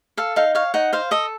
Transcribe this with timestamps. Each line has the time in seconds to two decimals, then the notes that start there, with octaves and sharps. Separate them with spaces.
0.17 A4 F5
0.36 D#4 F5
0.55 C#5 F5
0.74 D#4 F#5
0.93 C5 F5
1.11 A4 D#5